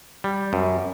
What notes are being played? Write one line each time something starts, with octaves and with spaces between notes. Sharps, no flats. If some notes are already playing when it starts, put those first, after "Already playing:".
G3
F#2